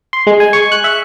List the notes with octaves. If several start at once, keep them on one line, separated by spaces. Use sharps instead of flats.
C6
G#3
G#5
C#6
F#6
E5